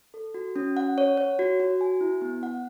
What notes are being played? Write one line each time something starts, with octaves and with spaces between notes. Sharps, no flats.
A4
F#4
C#4
F#5
C#5
C#5
F#4
F#4
G#5
E4
B3
F#5